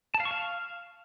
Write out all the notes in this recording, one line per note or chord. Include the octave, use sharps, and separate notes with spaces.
A5
F5
C#6
F5